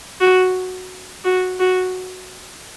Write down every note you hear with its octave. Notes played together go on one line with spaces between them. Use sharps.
F#4
F#4
F#4